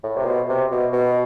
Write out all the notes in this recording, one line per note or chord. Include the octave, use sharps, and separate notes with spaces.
A2
C3
B2
C3
B2
B2